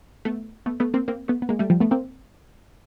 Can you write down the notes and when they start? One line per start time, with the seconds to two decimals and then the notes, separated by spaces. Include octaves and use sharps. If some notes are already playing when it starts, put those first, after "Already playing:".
0.25 A3 B3
0.66 A3 B3
0.80 A3 B3
0.94 A#3 C4
1.08 A#3 C4
1.28 A3 B3
1.42 B3
1.49 G#3 A#3
1.59 G3 A3
1.70 F3 G3
1.80 A3 B3
1.91 A#3 C4